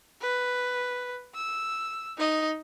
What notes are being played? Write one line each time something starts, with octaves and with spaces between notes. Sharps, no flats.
B4
E6
D#4 D#5